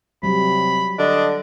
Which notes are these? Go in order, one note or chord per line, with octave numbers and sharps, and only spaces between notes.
C3 F#3 G3 B5
D3 D4 D#5